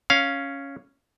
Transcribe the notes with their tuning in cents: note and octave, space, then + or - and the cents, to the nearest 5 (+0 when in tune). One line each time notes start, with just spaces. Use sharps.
C#4 +0 F5 +0